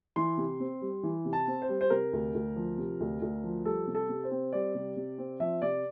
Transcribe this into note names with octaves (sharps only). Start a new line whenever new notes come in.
E3 C6
C3
C4
G3
E3
C3
A5
C4
C5
G3
C5
C3 A#4
D2
D2
F3
C3
D2
D2
F3
G3 A4
C3
A4
C3
C5
C4
G3 D5
C3
C3
C4
F3 E5
C3 D5